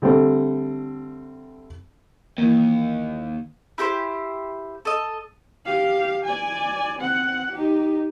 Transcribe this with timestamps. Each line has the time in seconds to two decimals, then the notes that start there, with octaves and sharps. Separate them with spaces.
0.02 D3 G3 A3 C4 A4
2.38 D#2 E3 A#3
3.78 E4 G4 A4 C5
4.85 A4 D#5
5.65 G4 F5
6.25 D5 G#5
6.98 C4 F#5
7.51 D#4 G4